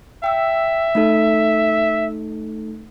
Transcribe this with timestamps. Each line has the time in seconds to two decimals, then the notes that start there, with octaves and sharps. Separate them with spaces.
0.24 E5 G5 E6
0.95 A3 D#4 A4